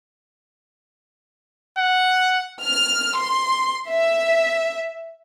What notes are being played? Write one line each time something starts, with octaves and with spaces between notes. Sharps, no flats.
F#5
F6
C6
E5